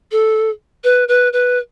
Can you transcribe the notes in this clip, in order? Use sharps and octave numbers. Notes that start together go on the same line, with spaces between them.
A4
B4
B4
B4